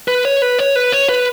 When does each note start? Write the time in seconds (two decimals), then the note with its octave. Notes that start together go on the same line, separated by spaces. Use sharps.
0.08 B4
0.25 C#5
0.42 B4
0.59 C#5
0.76 B4
0.92 C#5
1.09 B4